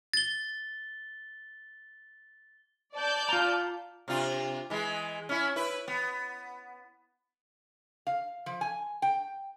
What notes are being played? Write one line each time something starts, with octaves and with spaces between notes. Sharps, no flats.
A6 G7
D5 A5 G6
F4 A#5
C3 D4 F4
E3 G#3
C#4 E4
E4 B4
B3
F5
F3
G#5
G5